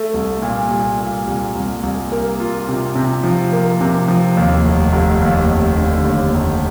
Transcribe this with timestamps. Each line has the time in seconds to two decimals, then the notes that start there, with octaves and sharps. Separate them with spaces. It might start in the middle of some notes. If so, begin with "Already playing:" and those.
Already playing: A3
0.14 C2
0.42 A#2
0.70 C2
0.99 A#2
1.27 C2
1.55 C2
1.83 C2
2.12 A#3
2.40 F4
2.68 C3
2.95 C3
3.24 F3
3.52 A#3
3.81 C3
4.08 F3
4.37 D#2
4.65 F1
4.93 F1
5.21 D#2
5.50 F1
5.78 D3
6.05 D#2
6.34 F1